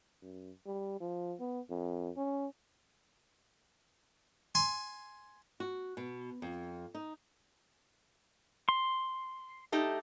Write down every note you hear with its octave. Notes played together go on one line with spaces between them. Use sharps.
F#2
G3
F3
B3
F2
C#4
G#5 C6
F#4
B2
F2
D#4
C6
A3 D#4 G4